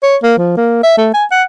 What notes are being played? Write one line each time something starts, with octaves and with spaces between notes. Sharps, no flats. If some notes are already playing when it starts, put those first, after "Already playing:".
C#5
A#3
F3
A#3
E5
A3
G#5
F#5